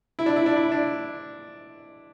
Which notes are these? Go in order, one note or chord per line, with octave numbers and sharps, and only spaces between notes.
E4
D4
E4
D4
E4
D4